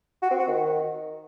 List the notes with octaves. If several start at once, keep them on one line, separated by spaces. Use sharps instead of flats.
F#4
C4
F#4
D#3